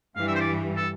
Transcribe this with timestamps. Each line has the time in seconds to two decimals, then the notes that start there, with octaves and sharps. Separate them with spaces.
0.16 G2 E3 G3 F5
0.28 E5
0.35 C5
0.40 D5
0.76 A4